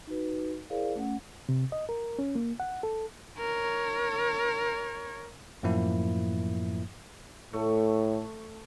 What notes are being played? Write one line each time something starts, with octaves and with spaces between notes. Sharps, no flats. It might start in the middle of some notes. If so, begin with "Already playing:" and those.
D#4 F#4 B4
E4 G#4 A#4 C5 D5 F5
A3 C#4 F#5
C3
D#5
A#4
C#4
A#3
F#5
A4
A#4 C#5
F#2 A2 F3 A#3 E4
A2 A3